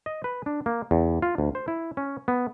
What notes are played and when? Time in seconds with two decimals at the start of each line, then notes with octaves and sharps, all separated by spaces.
0.06 D#5
0.24 B4
0.46 D4
0.66 A#3
0.91 E2
1.22 F4
1.38 D2
1.55 C5
1.68 E4
1.97 C#4
2.28 B3